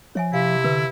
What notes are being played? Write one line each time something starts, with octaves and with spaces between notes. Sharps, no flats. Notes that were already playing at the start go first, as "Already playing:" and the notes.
F3 C#5 E5 G#5
C3 E4 F5
D3 B4